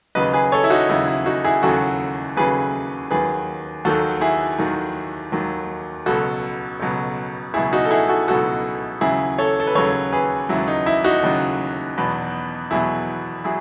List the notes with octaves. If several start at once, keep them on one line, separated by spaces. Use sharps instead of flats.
D#2 C#3 F#3 B4 D#5
G#4 B4
A4 C#5
E4
D#4 F#4
D#2 C#3 F#3 E4
E4
D#4 F#4
E4 G#4
D#2 C#3 F#3 F#4 A4
D#2 C#3 F#3 G#4 B4
D#2 D#3 F#3 G#4 B4
D#2 D#3 F#3 F#4 A4
E4 G#4
D#2 D#3 F#3
D#2 D#3 F#3
C#2 B2 F#3 F#4 A4
C#2 B2 F#3
C#2 B2 F#3 E4 G#4
D#4 F#4
A4
E4 G#4
F#4 A4
C#2 B2 F#3 F#4 A4
D#2 C#3 F#3 E4 G#4
A4 C#5
A4
B4
D#2 C#3 F#3 A4 C#5
G#4 B4
D#2 C#3 F#3 E4
D#4
E4
D#4 F#4
D#2 C#3 F#3
E2 B2 F#3
E2 B2 F#3 E4 G#4
F#3 E4 G#4